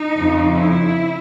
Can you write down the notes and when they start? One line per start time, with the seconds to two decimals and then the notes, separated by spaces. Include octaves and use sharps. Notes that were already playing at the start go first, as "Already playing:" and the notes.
Already playing: D#4
0.15 F2 C#3 F3
0.55 E4